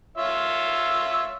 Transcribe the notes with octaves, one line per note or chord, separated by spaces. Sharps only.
F4 C#5 E5